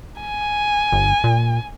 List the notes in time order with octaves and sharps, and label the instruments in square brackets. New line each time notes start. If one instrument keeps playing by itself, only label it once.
[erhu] G#5
[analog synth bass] G1
A#2